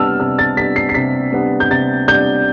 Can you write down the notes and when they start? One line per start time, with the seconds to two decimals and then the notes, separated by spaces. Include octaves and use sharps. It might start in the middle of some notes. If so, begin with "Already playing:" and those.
Already playing: C3 G3 B3 D4 A5 E6 F6
0.20 C3 F6
0.39 A6
0.57 G3 B3 D4 B6
0.76 C7
0.89 C7
0.94 C3 B6
1.32 G3 B3 D4
1.60 G6
1.71 C3 A6
2.08 G3 B3 D4 G6